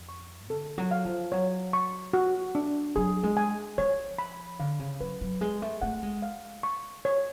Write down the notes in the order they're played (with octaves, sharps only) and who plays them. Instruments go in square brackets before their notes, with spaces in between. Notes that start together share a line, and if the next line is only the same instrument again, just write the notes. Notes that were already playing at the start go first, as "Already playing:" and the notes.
Already playing: [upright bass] F2
[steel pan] C#6
[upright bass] D3 [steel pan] A4
[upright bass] F#3
[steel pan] F5
[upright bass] F3
[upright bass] F#3 [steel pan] C#5
[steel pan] C#6
F#4
D4
[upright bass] F#3 [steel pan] G#4
[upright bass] G#3
[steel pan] G#5
[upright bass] F3 [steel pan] C#5
[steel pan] B5
[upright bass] D3 [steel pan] F5
[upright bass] C#3
[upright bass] F#3 [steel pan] B4
[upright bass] F#3
[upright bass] G#3 [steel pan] G#4
[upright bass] A3
[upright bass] A3 [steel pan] F#5
[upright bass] G#3
[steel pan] F5
C#6
C#5